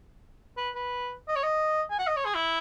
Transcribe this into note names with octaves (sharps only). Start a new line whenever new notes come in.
B4
B4
D#5
C#5
D#5
G#5
F#5
D#5
C#5
G#4
E4